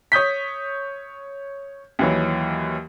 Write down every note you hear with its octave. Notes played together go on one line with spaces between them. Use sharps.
C#5 D#6 G6 B6
D#2 E3 F#3